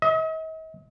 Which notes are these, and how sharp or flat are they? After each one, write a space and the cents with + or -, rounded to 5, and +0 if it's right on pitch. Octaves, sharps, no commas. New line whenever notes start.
D#5 +45